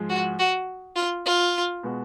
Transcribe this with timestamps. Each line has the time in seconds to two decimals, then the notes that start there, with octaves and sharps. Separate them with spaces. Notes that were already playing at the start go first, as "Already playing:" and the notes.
Already playing: G#2 F3 G#3
0.09 F#4
0.39 F#4
0.96 F4
1.25 F4
1.83 B2 G#3 B3 F#4